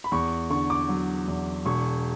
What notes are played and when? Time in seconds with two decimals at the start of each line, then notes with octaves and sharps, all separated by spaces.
0.04 B5
0.12 E2 C#6
0.50 D3 C#6
0.70 D6
0.89 F#3
1.27 E2
1.65 E1 C#6